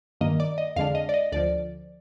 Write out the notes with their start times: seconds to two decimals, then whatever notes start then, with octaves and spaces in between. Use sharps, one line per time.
0.21 G2 D#3 A#3 D#5
0.40 D5
0.58 D#5
0.76 F2 D3 G#3 D4 F5
0.95 D#5
1.09 D5
1.14 D#5
1.32 D2 D3 F3 D5